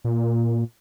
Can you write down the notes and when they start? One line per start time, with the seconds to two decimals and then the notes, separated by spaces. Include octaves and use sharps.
0.04 A#2